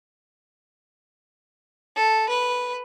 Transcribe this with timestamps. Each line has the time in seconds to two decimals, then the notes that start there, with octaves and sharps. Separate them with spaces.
1.97 A4
2.29 B4